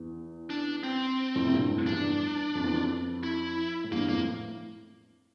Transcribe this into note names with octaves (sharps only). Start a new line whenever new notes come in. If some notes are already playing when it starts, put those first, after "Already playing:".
Already playing: E2
D4
C4
F2 A2
C3
G2 A#2
F2 A2
E2 G2 D4
F2
E2
F2
E4
A2
E2 G2 A#3
F2 A2 A#3
A2